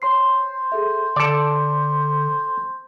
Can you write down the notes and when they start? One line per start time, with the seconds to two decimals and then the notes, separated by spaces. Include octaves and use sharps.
0.02 C5 C#5 C6 C7
0.72 G#4 A4 E5
1.16 D3 A4 D5 D6